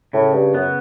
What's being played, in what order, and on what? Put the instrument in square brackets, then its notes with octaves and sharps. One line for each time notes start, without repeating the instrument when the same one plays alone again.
[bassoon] A2 [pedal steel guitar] C#3
[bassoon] G2
[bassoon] F#2 [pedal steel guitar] B3